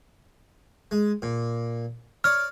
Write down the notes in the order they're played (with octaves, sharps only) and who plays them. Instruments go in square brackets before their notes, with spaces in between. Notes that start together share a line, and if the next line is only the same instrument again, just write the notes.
[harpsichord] G#3
A#2
[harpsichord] C#5 D5 [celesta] F6